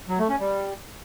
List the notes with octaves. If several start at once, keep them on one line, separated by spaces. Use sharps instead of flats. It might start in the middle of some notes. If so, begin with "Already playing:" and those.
F#3
A3
C#4
G3